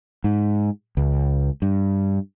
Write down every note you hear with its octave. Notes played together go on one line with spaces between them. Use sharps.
G#2
C#2
G2